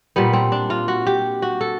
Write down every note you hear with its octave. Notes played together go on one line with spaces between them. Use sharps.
A#2 G3 B3
C4
D4
F4
F#4
G4
F#4
A4